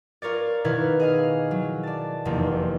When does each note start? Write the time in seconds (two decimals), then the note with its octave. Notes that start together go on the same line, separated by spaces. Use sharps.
0.22 F4 A#4 C#5 D5
0.64 B2 D#3 E4 B4 F5 G#6
0.99 G#4 D#5 F5
1.51 F#3
1.83 D5 A5
2.25 F1 E2 A#3 C4